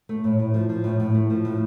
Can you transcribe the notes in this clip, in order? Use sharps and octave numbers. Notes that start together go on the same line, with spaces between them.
A3
A2
A2
F3
F3
A2
A2
A3
F3
A2